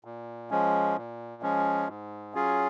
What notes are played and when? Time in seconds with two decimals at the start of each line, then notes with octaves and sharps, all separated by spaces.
0.04 A#2
0.51 F3 G#3 C#4
0.97 A#2
1.42 F3 G#3 C#4
1.88 G#2
2.34 F#3 C#4 F4 G#4